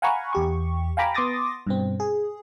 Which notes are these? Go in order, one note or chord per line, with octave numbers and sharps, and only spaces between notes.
F5 F#5 G#5 A#5 B5 C#6
E2 G4 C#6
F5 G5 G#5 A#5 B5 D6
B3 C6 D6 D#6 A6 A#6
G2 B2 C4
G#4